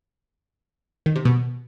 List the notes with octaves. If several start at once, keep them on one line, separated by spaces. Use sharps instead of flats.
D#3
C3
B2